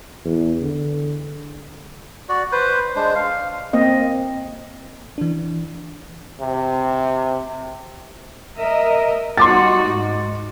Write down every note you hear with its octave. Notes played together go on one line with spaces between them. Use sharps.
E2
D3
F#4 D5
B4 C5
G#3 D4 C5
F5
A#3 C4 D#5
E3 D4
C3
A#4 D#5 E5
G3 D#4 F#4 C6 D6 A6
G#2